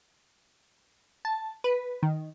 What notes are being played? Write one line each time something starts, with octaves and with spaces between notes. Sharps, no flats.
A5
B4
D#3